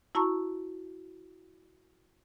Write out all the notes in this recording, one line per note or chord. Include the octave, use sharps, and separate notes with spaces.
E4 F#4 A5 A#5 C#6 E6